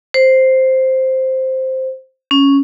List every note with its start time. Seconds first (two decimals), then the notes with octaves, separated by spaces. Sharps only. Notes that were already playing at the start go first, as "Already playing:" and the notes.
0.14 C5
2.31 C#4